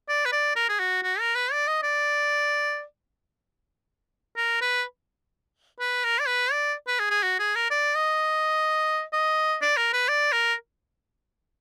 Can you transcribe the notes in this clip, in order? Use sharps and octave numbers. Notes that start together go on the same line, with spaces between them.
D5
B4
D5
A#4
G#4
F#4
F#4
A#4
B4
D5
D#5
D5
A#4
B4
B4
A#4
D5
B4
D5
B4
G#4
G#4
F#4
G#4
A#4
D5
D#5
D#5
D5
A#4
B4
D5
A#4